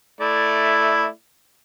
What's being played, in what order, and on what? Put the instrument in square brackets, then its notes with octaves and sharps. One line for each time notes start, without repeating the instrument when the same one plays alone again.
[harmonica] A3 E4 D5